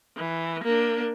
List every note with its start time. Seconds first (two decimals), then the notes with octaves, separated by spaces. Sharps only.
0.17 E3
0.64 A#3 D4